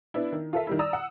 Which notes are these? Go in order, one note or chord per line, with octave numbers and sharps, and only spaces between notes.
B3 D4 E4
D#3
F4 A4 A#4 E5
D#3 G3 E4
D5 A#5 D#6 E6
F#5